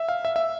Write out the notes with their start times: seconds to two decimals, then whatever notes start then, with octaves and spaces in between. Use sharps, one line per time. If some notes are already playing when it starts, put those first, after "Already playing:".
Already playing: E5
0.09 F5
0.25 E5
0.36 E5